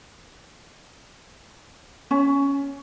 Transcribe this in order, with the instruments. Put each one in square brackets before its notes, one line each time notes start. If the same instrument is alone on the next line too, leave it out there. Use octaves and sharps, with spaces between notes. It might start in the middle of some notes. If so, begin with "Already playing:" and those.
[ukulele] C#4